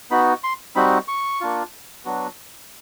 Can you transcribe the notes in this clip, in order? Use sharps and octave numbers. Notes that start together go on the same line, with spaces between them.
B3 D#4 F#4 B5
C6
G3 C4 D#4 F#4 B5
C#6
A#3 D4 F4
F#3 B3 D4 F#4